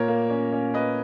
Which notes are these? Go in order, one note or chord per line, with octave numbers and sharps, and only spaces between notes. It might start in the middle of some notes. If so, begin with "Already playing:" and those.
Already playing: A#2 A#4 C#5
A#3
C#4
C#4
A#3 B4 D#5